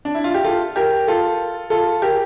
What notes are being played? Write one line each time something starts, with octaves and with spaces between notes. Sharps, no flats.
D4
E4
F4
G4
F4 A4
G4 A#4
F4 A4
F4 A4
G4 A#4